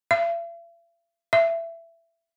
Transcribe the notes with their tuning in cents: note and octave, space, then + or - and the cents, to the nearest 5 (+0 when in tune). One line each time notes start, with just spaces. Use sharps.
E5 +45
E5 +20